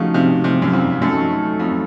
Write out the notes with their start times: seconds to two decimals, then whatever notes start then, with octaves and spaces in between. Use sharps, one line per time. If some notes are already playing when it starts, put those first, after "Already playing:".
Already playing: C#3 F3 A3 D#4 F#4
0.14 C3
0.44 C3
0.62 F#2
0.73 F2
1.01 F#2 F#3 A3 D#4 A4
1.59 F2